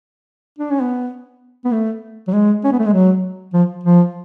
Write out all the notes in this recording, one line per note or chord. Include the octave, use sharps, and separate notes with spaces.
D4
C#4
B3
B3
A3
F#3
G#3
C#4
B3
A3
G#3
F#3
F3
F3